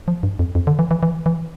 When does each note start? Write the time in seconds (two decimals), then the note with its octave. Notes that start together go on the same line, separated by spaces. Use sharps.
0.08 F3
0.23 G2
0.39 F2
0.55 F2
0.67 D3
0.79 E3
0.91 E3
1.03 E3
1.26 E3